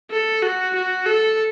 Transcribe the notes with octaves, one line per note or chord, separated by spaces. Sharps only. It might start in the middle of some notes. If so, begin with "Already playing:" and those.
A4
F#4
F#4
A4